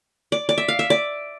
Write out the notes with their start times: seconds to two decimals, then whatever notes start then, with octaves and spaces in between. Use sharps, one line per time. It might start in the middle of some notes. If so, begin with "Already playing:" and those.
0.32 D5
0.49 D5
0.58 E5
0.68 F5
0.79 E5
0.90 D5